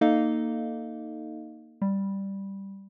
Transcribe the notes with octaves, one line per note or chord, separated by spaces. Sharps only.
A#3 D#4 A4 D#5 F5
G3